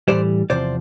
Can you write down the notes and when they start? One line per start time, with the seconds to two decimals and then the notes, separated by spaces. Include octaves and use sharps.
0.08 A2 E3 G3 C5 D5
0.50 E2 C3 F3 C5 D5